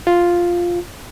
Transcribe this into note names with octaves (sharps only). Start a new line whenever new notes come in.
F4